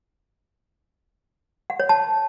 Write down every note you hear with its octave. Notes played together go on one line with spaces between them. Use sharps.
F#5
C#5
A5